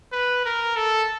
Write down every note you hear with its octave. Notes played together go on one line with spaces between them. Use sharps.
B4
A#4
A4